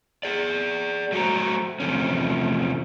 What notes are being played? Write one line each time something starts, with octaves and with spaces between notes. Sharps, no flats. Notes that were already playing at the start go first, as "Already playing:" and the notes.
G#4 D5
F#3 A3 F#4 C5 A#5
E2 C3 F3 A3 C#4